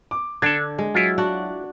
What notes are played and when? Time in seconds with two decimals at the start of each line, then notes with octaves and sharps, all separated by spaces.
0.11 D6
0.42 D3 D4 A4 G#6
0.79 G#3
0.95 F#3 E4 F4
1.18 D4 F#4 D5